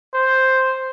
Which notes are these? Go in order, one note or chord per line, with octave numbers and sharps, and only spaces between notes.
C5